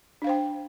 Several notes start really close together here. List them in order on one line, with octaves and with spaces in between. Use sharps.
D4 F5 C5 G5